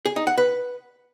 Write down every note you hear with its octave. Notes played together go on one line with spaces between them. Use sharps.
G#4
D#4
F#5
B4